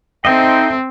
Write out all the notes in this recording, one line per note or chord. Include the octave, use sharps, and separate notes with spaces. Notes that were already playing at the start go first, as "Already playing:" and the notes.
C4 D#4 A4 C5 D#5 E5 G5